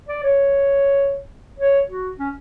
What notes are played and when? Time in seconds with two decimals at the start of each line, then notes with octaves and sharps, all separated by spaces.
0.09 D5
0.23 C#5
1.59 C#5
1.89 F#4
2.19 C#4